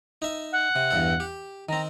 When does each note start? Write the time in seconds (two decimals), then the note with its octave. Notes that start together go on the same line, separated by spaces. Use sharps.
0.22 D#4 E5
0.52 F#5
0.76 C3
0.91 E2 G2 A4
1.20 G4
1.69 D#3 C4 A#5